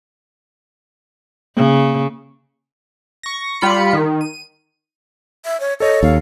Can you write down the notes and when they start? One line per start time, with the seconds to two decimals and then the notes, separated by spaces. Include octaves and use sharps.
1.57 C#3 A#3
3.23 C#6 A#6
3.61 G3 F4 B5 C#7
3.93 D#3
4.21 D#7
5.45 E5
5.60 C#5
5.80 A4 C#5 D#5
6.03 D#2 F5